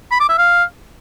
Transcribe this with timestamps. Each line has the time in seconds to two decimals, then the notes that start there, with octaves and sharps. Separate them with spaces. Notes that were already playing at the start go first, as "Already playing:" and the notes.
0.11 B5
0.20 D6
0.29 E5
0.38 F5